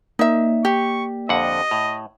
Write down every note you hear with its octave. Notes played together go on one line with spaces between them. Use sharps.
A#3 D#4 D5 E5
G4 C#6
F2 D3 D#5 F#5
A2